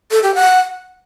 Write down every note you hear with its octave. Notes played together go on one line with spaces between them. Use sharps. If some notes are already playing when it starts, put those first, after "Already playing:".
A4
G4
F#5